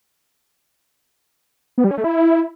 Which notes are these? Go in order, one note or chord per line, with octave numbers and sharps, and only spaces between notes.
B3
G3
C#4
A3
E4